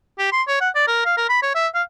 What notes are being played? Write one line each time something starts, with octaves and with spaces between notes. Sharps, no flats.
G4
C6
C#5
F#5
D5
A#4
F5
A#4
B5
C#5
E5
F5